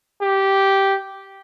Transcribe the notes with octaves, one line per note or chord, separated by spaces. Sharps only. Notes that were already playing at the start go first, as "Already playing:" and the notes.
G4